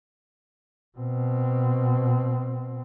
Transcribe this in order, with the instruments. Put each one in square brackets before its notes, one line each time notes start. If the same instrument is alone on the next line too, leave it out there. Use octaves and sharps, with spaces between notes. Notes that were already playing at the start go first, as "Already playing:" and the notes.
[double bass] B2 C4